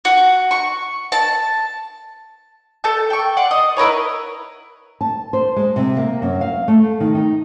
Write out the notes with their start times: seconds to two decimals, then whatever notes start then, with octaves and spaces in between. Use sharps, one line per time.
0.05 F#4
0.51 C#6
1.12 A5
2.84 A4 A5 G6
3.10 G5 C#6
3.37 D5 F#5 C6
3.51 D#5
3.77 E4 A#4 B4 C#5
5.01 A5
5.33 C5
5.56 G#3
5.76 C3
5.97 A#3
6.22 F#2
6.41 F5
6.68 A3
7.00 D#3
7.15 D#4